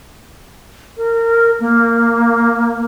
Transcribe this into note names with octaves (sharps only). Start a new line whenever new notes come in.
A#4
A#3